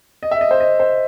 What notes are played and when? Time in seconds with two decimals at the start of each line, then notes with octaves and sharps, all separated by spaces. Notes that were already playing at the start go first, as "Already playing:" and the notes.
0.23 D#5
0.31 E5
0.41 D#5
0.51 C5
0.60 D#5
0.80 C5